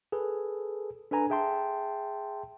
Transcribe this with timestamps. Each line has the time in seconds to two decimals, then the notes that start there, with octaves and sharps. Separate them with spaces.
0.12 G#4 A4 B4
1.11 D4 A4 B4 G#5 A#5
1.30 G#4 E5 G5 A5 C6